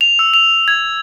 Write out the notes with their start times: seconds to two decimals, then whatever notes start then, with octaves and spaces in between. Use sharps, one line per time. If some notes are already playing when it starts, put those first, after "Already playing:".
0.01 F7
0.19 E6
0.34 F7
0.68 G#6